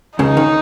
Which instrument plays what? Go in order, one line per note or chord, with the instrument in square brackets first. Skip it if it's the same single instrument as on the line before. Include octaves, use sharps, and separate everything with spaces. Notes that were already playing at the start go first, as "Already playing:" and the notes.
[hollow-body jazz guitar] C#2 C#3 [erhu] D#4
[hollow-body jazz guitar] D#3